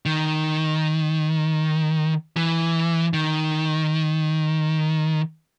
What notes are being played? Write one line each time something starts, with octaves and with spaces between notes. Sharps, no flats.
D#3
E3
D#3